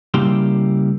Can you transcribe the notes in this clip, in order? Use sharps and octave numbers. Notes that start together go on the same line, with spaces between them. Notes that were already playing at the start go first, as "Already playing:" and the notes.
C#3 G3 A#3 E4 G4 C6